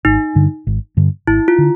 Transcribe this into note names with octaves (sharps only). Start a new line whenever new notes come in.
G#1 D#4
G2 D3
G#1
G2 D3
G#1 E4
F4
D3